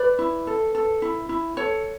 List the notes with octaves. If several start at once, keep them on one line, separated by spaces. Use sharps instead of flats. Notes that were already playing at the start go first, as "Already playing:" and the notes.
Already playing: B4 D5
E4
A4
A4
E4
E4
A4 C#5